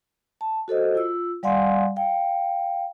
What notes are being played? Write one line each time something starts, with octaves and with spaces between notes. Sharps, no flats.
A5
F#4 A4 C5 D#5
F4 E6
G3 D5 F5 F#5 G#5 C6
F5 G5